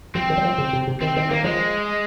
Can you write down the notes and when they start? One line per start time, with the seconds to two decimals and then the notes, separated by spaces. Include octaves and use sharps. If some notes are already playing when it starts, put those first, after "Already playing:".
0.15 F3 C4
0.30 D#3
0.38 F#3
0.45 F3
0.58 C#3
0.73 C3
0.87 C3
1.01 D#3 C4
1.16 D#3 C4
1.30 D#3 A#3
1.44 F3 G#3